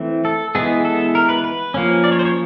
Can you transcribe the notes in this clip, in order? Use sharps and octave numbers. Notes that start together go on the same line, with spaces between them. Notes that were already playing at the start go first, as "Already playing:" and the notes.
Already playing: E3 A3 C4
A4
E3 G#3 B3 G#4
A4
A#4
B4
B4
F3 A#3 C#4
D5
C#5
C5
C#5